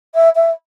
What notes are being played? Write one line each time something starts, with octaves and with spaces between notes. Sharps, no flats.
E5
E5